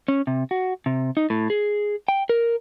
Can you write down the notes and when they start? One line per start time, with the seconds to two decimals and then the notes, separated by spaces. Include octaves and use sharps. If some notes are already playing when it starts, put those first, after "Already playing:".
0.08 C#4
0.27 C3
0.51 F#4
0.86 C3
1.17 D#4
1.30 A2
1.50 G#4
2.08 G5
2.29 A#4